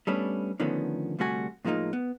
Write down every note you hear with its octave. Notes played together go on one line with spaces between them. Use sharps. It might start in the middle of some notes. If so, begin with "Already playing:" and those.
G3 A3 B3 C#4 D4
D3 D#3 F3 A3 B3 C#4
D2 C3 G3 A3 F#4 G#5
A2 F3 G#3 A#3 D#4 F4
B3